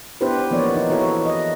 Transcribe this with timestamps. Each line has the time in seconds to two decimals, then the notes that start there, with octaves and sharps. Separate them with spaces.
0.21 B3 D4 E4 G4 B4 C5
0.51 E3 F3 A#3 B3 C#5 D5
0.74 D#4
0.90 E3 E4 F#4 A4 C#5
1.26 B4 D#5